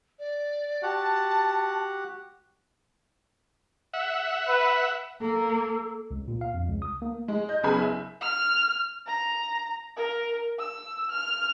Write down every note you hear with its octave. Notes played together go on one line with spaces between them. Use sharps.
D5
F#4 G4 F#5 A5
E5 F#5
B4
A#3 A4
C#2
A#2
F5
F2
C#2
D#6
A#3
G#3
D#5 G6
F#1 C#3 B3 G#4 G#5 B5
E5
F6
A#5
A#4
E6
F6